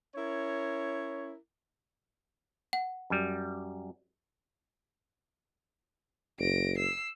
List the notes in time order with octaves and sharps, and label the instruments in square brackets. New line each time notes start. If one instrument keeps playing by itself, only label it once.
[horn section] C#4 E4 A#4 C#5
[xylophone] F#5
[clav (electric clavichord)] F#2 G3
[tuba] F#1 [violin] A#6 D7
[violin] E6 C7